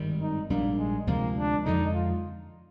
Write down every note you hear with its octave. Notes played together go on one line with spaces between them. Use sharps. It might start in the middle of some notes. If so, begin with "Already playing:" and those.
Already playing: G#1 G2 D#3 G3
D#4
A#1 G#2 G3 A#3 D4
G#3
D2 C3 F3 G#3 A#3
D4
F2 D3 G#3 D#4
F4